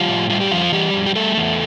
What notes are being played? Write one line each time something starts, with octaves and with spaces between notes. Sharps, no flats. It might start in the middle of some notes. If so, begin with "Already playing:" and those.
Already playing: F3 G3 F4
A2
G3 F4
G4
F2 F3 F4
E3 G3 G4
F2
G4
G3 A3 A4
E2